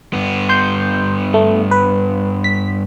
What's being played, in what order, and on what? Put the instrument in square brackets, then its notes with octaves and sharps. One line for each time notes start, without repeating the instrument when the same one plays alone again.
[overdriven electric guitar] G2 B3
[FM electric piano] C6 G6
A3
B4
B6